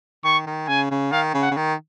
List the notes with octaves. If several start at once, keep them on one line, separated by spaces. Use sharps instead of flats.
D#3 C#6
D#3
C#3 G#5
C#3
D#3 F5
C#3
F#5
C#3
D#3